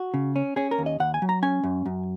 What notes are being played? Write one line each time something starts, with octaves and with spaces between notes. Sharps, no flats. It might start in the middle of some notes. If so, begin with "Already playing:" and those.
Already playing: F#4
C#3
C#4
C#4 G#4
A#4
D#2
D#5
D#2 F#5
G#5
F#3
A#5
C#4 G#5
F#2
F#2